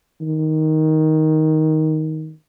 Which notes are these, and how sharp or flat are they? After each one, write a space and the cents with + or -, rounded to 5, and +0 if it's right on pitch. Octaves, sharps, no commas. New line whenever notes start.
D#3 +10